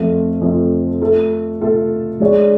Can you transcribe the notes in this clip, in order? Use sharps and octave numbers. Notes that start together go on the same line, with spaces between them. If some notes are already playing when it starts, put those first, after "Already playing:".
Already playing: F2 F3 A3 F4
F2 F3 A3 F4
A3 F4 A4
A3 F4 A4
G#3 D4 G#4 C#5